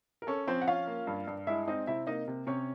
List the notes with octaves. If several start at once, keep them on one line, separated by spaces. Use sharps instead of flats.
A#4
C#4 A4
F3 C4 C5
F#5
C#4 F4 F5
A#3
G2
G2
G#3 E4 E5
C4 D#4 D#5
C3 E4 E5
A#3 D#4 D#5
C3
C3 C#4 C#5